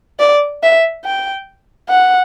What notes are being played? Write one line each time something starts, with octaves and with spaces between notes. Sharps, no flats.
D5
E5
G5
F#5